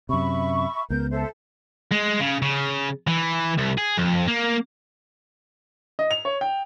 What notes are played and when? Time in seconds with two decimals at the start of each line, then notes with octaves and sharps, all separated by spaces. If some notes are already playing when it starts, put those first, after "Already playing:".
0.09 F#2 C3 E5 B5 C#6
0.90 C#2 B3 A#4 G6
1.11 A4 C5 E5
1.91 G#3
2.20 C#3
2.42 C#3
3.07 E3
3.58 C2
3.78 G#4
3.98 F2
4.28 A#3
5.99 D#5
6.11 F7
6.25 C#5
6.41 G5